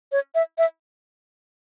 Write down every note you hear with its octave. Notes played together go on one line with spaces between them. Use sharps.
C#5
E5
E5